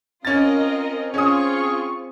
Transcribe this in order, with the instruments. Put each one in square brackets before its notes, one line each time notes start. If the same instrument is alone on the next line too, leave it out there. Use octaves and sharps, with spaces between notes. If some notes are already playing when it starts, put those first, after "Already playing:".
[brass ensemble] C4 [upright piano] C#4 A6 [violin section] F4 A#4 D#5
[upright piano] C#4 D#6 [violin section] F4 C#6 [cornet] G#4